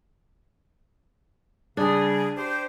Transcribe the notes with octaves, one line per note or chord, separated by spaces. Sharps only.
C#3 G3 D4 G#4
G4 C5